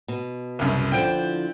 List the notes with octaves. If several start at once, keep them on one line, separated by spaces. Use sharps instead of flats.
B2
C2 F#2 C#3
D3 F3 E4 G5 G6 D7